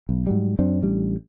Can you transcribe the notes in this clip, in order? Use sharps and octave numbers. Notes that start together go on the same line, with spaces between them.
B1
G#2 F#3 G3
F#2 F#3 C4 D4
A1 G3 D4